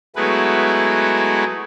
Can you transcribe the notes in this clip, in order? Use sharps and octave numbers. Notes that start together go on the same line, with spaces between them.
F#3 G#3 A3 B3 E4 B4